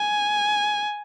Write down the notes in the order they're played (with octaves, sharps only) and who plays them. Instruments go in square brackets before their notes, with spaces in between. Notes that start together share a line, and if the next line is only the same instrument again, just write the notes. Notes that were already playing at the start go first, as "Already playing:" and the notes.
Already playing: [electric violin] G#5